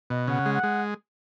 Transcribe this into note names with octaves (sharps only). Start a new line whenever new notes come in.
B2 D#5
C#3 F#5
G#3
F#5
G#3